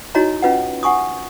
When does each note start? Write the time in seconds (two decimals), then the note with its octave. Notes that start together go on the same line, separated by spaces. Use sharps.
0.15 D#4 E4 F#4 C#5 D#5 A#5
0.42 C#4 F4 B4 D#5 F#5
0.83 F#5 G#5 C#6 D#6